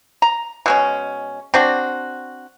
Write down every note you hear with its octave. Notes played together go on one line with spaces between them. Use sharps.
A#5
B2 G#3 C#4
C4 D4 F#4